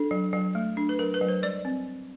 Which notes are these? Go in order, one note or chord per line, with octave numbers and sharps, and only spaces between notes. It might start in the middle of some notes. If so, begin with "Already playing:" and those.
Already playing: D4 A4
F#3
F#3
A3
D4
B4
F#3 A#4
B4
F#3
C5
G3 D5
C4